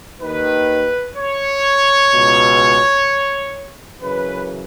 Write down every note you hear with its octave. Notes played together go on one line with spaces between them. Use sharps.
D#2 D#3 B4
C#5
C#2 B2
F#2 C#3 E3 B4